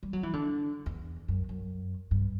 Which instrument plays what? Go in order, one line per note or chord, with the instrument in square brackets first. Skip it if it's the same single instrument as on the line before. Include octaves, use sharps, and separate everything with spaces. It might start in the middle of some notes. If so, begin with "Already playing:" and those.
[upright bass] G3
F#3
E3
D3
E2
F#2
F#2
G2